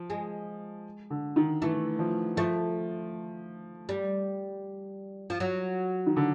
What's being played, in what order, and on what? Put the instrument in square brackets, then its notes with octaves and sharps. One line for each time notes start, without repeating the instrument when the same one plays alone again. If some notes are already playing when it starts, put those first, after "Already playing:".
Already playing: [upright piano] F3
[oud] G#3
[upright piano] D3
D#3
[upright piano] E3 [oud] A3
[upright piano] F3
[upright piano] F3 [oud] A3
[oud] G3
F3
F#3
[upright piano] D#3
D3